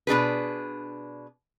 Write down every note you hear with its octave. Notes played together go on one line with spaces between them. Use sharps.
B2 D4 G#4 B4